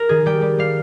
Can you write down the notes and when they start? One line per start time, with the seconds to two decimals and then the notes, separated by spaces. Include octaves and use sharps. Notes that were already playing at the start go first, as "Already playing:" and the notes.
Already playing: A#4
0.09 D#3 G#4
0.26 G3 G5
0.42 G3
0.59 G3 F5